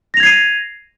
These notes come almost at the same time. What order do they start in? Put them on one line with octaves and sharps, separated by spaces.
A#6 F7 G#6 C7 D#7